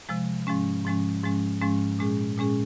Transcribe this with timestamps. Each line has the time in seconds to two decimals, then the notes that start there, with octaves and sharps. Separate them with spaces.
0.09 C3 F3 G#3
0.47 G#2 F3 G#3 C#4
0.85 G#2 F3 G#3 C#4
1.23 G#2 F3 G#3 C#4
1.61 G#2 F3 G#3 C#4
1.99 A#2 G#3 C#4 G#4
2.38 A#2 G#3 C#4 G#4